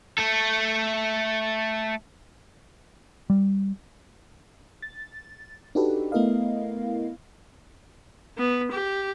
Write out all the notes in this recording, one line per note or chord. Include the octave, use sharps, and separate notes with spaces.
A3 A4
G3
A6
D4 D#4 F#4 G4 A4 B4
A3 B3 E4 A#4 D#5 F5
B3
G4